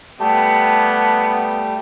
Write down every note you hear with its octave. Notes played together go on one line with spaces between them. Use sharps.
G3 A3 B3 G4 A5